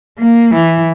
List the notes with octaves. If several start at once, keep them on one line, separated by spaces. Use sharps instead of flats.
A#3
E3